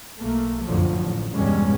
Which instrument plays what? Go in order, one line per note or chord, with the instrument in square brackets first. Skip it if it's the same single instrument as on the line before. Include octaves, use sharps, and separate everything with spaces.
[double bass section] B1 A3 A#3
F#1 F2 A2 D3 F3 F#3
A1 A2
E2 G2 B2 G3 G#3 C#4